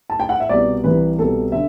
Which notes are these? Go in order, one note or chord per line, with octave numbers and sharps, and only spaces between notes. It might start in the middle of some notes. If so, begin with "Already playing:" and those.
A5
G5
F#5
E5
C2 B2 D5
C2 C3 E3 B4
C2 B2 A4
D3 E5